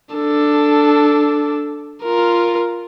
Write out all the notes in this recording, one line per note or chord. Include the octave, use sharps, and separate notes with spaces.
D4 A4
F4 A#4